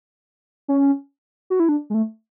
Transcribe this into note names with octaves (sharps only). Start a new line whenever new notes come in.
C#4
F#4
E4
D4
G#3
A3